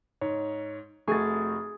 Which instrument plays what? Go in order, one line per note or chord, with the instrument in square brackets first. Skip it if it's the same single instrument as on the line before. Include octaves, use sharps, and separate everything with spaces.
[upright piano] G#2 [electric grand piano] C#5
[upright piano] F1 F#4 C#6 [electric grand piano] A3 [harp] G#4 A6